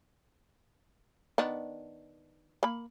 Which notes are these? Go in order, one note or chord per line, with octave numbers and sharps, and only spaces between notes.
D#3 B3 D4
A#3 B5